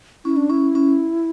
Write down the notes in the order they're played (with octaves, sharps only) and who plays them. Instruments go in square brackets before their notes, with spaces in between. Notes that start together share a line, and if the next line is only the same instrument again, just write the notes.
[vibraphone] C#4 [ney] E4
[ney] D4
[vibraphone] C#4 [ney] E4
[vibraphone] C#4